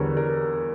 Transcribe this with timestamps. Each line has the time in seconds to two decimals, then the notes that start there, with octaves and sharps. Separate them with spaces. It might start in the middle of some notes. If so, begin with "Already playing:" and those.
Already playing: E2 D3 G3 A#4 C#5
0.17 A#4